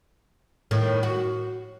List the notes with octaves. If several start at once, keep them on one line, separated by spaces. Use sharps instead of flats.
A2 D#3
F#4